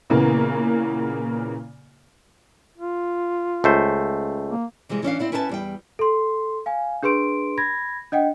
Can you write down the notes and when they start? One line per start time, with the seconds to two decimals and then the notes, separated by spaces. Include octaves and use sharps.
0.10 A#2 C#3 E3 A#3 B3
2.78 F4
3.64 C#2 A3 C5
4.49 A#3
4.89 C3 E3 G3 G#3
5.03 E3 C#4 D4 F5
5.20 C4 E4 D5
5.32 C#4 E4 B4 E5 F#5 A5
5.49 E2 G3 G5
5.99 A4 C6
6.66 F5 G#5
7.03 D4 G#4 B4 C6 D7
7.58 B5 G#6 A#6
8.12 D4 D#5 F#5 G5